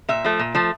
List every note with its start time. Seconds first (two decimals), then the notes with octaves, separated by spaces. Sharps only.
0.09 A#2 E5
0.24 F3 A3
0.39 A#2
0.55 F3 A3